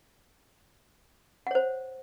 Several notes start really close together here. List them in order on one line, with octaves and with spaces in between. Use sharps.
F#5 C#5 C5